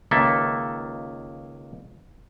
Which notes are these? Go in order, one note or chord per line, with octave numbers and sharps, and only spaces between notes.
C#2 D#3 A#3 A4 E5